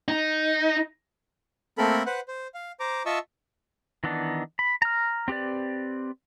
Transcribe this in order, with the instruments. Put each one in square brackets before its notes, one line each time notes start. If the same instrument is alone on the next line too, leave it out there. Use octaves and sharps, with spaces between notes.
[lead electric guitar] D#4
[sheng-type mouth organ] A3 A#3 C4 A4 A#4 B5
B4 C5 F#5
C5
F5
C5 A#5 D6
F4 D#5 E5 A5 C#6 E6
[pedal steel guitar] D#3 E3 B3 D4 D#4
B5
A#5 F6
C4 G4 B4 D5